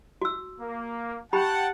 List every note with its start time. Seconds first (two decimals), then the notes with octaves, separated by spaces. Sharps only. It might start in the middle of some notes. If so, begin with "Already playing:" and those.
0.21 F#4 E6
0.61 A#3
1.33 G4 F#5 G5 A5 B5